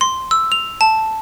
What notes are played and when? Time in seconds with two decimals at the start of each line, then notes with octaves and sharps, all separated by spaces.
0.01 C6
0.31 E6
0.52 F7
0.81 A5